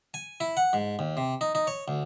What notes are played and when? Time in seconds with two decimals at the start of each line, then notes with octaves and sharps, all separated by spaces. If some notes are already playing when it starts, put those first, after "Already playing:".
0.14 G#5
0.40 E4
0.57 F#5
0.73 G#2
0.99 D#2
1.17 C3
1.41 D#4
1.55 D#4
1.67 C#5
1.88 D2